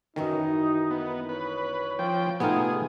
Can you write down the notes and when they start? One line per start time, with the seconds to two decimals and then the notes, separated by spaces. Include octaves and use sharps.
0.16 F#2 D#3 E3 C#4 D#4
0.91 B3
1.29 B4 C#5
1.99 F3 G5
2.40 C3 A3 B3 D#4 F4 G#4